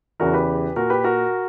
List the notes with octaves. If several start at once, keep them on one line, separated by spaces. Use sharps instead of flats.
E2 C#3 E3 F#4 A#4
G4 B4
A#2 F#4 A#4
G4 B4
F#4 A#4